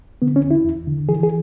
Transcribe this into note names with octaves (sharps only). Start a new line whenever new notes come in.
D3 B3
C#4
E2
E4
E2
D3
E3 G#4
G#4